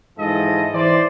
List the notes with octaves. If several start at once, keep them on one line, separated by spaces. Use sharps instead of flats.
G#2 E3 F3 E4 A4 D#5
E3 C5 D5